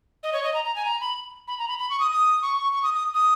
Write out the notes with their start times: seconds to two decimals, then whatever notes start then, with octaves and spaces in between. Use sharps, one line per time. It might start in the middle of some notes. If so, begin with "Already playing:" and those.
0.23 D#5
0.33 C#5
0.43 D#5
0.54 A#5
0.65 A#5
0.76 G#5
0.85 A#5
1.01 B5
1.48 B5
1.59 A#5
1.68 B5
1.79 B5
1.90 C#6
2.00 D#6
2.11 D#6
2.42 C#6
2.57 C#6
2.72 C#6
2.83 D#6
2.94 D#6
3.13 D#6